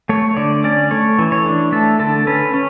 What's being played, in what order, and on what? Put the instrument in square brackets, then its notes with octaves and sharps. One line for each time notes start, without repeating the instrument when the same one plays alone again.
[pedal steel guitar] A3 C#5
D3 D5
C#4 D5
A3 C#5
E3
C#5
D4
A3 A4
D3 A4
C#4 B4
C#4